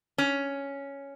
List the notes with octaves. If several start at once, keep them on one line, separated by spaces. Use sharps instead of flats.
C#4